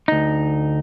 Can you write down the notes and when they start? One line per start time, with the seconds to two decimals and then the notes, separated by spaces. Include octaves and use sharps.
0.08 D2 D#4